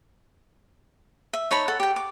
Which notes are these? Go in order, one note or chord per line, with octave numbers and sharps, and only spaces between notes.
E5
D#4 C#5 A5 B5
A4 F#5
G4 G5
D6